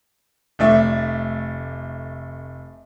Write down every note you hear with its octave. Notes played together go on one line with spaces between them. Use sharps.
F1 A3 D5 E5